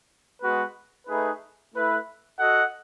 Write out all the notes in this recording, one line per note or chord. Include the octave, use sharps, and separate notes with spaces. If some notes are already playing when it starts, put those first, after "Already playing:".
G#3 B3 F#4 B4
A3 D#4 G#4 B4
A3 E4 B4
F#4 A4 D#5 F#5